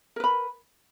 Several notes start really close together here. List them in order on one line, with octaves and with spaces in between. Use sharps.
A#4 B4 B5